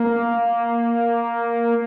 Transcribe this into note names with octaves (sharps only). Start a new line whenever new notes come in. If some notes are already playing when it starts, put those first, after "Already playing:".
Already playing: A#3